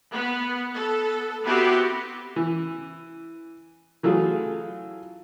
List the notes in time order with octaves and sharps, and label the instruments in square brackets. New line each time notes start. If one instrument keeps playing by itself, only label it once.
[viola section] B3
B3 A4
B3 C4 E4 F#4 G4
[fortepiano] E3
E3 F#3 A3 F4 G#4